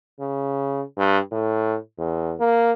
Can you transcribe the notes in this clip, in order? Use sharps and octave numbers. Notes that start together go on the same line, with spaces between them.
C#3
G2
A2
E2
A#3